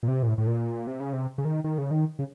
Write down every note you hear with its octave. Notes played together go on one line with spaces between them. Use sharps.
A#2
C3
A#2
A2
A2
A#2
C3
C#3
C3
C#3
D#3
D#3
C#3
D#3
C#3